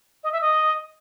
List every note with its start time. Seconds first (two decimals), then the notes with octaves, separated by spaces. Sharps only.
0.23 D#5
0.32 E5
0.41 D#5